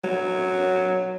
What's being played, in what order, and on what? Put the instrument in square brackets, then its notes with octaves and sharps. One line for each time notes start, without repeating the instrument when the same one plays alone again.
[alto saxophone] F#3